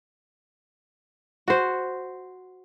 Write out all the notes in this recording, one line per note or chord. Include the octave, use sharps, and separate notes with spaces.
F#4 C5